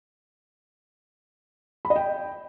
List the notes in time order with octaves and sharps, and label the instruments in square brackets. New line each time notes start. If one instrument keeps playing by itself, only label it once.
[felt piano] B5
D#5
G5